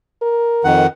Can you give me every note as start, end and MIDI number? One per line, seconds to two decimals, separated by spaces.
0.22 0.77 70
0.64 0.87 41
0.64 0.87 51
0.64 0.87 78